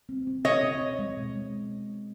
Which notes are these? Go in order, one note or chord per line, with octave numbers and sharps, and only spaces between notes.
C4
C4
B2 C#5 D#5
C4
B2
G#3
B2
G#3